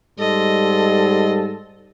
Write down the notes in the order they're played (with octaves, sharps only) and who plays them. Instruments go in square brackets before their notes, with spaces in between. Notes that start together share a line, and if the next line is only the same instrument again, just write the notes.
[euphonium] G#2 [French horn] G3 [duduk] A4 [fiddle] D#5 C6